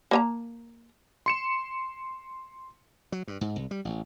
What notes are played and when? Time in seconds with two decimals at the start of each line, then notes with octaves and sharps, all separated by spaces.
0.11 A#3 D#5 A#5
1.26 C6 C#7 E7
3.12 F#3
3.28 G2
3.41 G#2
3.56 C2
3.71 G3
3.85 A1